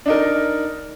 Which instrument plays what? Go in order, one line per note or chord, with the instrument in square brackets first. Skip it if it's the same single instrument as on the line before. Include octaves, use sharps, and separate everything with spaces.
[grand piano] D4 D#4 A#4